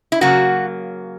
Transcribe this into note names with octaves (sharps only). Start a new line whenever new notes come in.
E4
C#3 F#3 A#3 F#4